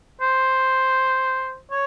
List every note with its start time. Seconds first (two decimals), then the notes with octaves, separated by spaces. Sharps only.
0.22 C5
1.71 C#5